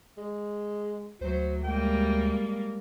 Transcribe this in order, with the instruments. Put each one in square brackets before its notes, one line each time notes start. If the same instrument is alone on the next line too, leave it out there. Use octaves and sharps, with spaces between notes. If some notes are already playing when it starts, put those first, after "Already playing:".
[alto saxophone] G#3
[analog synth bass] D2 [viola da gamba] F#3 [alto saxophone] C5
[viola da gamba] G3 G#3 A#3 [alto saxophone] G5